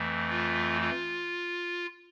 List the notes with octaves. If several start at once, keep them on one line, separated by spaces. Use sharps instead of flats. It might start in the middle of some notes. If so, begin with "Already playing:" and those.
Already playing: F2 E3 A3
F4
F4